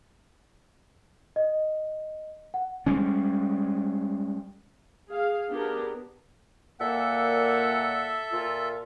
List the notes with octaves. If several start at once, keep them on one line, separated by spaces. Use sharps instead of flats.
D#5
F#5
G3 G#3 C#4
G#4 F5
B3 D4 G4 G#4 A#4
A#2 A#3 A4 E5 F#5
A#2 F4